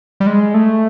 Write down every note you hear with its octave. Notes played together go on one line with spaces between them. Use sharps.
G3
G#3
A3